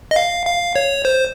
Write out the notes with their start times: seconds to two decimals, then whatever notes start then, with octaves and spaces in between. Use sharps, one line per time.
0.11 D#5
0.16 F5
0.46 F5
0.76 C#5
1.05 C5